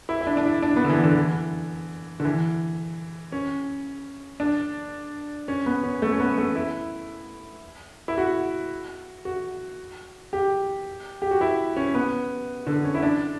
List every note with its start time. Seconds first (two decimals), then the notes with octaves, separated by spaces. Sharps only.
0.09 E4
0.21 E4
0.27 D4
0.37 D4
0.45 E4
0.62 D4
0.76 B3
0.84 D3
0.90 E3
1.04 D3
1.16 E3
2.20 D3
2.25 E3
3.32 C#4
4.40 D4
5.48 C#4
5.66 B3
5.84 C#4
6.02 A3
6.12 C#4
6.20 B3
6.37 A3
6.55 E4
8.08 E4
8.18 F#4
9.25 F#4
10.33 G4
11.22 G4
11.31 F#4
11.41 E4
11.76 C#4
11.94 B3
12.67 D3
12.84 C#4
12.95 E4
13.03 D4